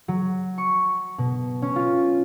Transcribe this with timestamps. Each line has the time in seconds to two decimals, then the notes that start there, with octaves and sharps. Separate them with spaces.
0.08 F#3
0.58 C#6
1.18 B2
1.62 C#4
1.76 F4